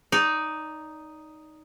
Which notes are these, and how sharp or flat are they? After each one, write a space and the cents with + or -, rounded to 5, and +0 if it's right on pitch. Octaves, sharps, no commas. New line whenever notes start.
D#4 +0 D5 -25